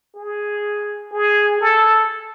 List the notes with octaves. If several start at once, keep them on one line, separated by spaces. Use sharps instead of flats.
G#4
G#4
A4